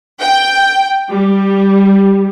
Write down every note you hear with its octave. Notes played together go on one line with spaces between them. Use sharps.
G5
G3